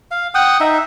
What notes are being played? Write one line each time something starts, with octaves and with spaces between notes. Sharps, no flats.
F5
F#5 G5 D#6
D#4 E5